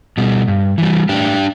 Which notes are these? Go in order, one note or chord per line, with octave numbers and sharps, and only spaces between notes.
B2 G3
G2
E3 G3
A2 D4 G4